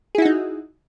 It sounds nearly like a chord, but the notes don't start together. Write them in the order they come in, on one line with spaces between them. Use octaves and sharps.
G#4 E4 F#4 D#4